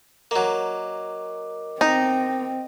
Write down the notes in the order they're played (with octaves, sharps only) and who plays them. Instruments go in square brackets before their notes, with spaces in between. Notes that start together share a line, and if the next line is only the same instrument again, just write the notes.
[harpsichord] F#3 A#3 [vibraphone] A#4 D#5 D6
[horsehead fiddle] C4 [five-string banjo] D#4